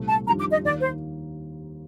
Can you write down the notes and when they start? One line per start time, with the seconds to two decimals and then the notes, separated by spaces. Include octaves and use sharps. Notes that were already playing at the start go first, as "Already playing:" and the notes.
Already playing: C2 A#2 A3 C4
0.08 A5
0.26 F2 D#3 G3 D4 F4 A#5
0.39 D6
0.51 D#5
0.63 D#2 D#3 A#3 D5
0.81 C5